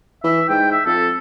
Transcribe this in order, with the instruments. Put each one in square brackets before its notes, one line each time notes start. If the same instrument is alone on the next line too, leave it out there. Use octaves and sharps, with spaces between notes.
[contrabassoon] E3 [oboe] E5
[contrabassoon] G#2 [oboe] G5
[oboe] E5
[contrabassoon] F2 [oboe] A4